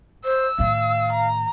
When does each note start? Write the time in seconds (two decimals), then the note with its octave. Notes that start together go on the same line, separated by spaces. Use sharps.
0.25 C5 E6
0.59 A2 D#3 F5
1.12 A#5